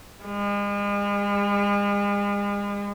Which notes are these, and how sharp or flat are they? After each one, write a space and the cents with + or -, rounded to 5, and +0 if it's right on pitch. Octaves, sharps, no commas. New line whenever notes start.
G#3 -40